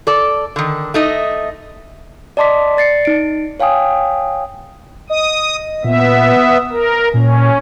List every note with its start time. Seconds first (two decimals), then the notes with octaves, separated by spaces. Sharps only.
0.07 A4 D5
0.56 D3 D#3
0.94 A3 D#4 D#5
2.37 D5 D#5 A5 C6 D6 B6
2.77 D5 A6 C7 C#7
3.05 D#4 D7
3.60 C#5 F5 G5 G#5 D#6
5.10 D#5 D#6
5.84 A#2 B3 E5
6.37 D#6
6.71 A#4
7.14 A#2 C#4